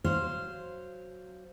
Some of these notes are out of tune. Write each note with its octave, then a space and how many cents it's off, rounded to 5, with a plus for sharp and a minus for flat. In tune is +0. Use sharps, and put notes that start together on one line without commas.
F#3 +0 C5 +0 F5 -15